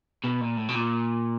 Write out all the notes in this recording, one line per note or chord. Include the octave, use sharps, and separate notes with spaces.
B2
A#2
A2
B2
A#2